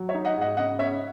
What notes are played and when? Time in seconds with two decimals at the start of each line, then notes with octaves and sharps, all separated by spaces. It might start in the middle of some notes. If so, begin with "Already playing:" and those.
Already playing: F#3
0.09 C#5 E5
0.14 D#4
0.25 D#5 F#5
0.36 G#2
0.41 D#5 F#5
0.57 C#3 D#5 F#5
0.79 C#3 C#5 E5